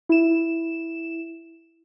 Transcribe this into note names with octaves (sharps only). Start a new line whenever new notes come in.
E4 E7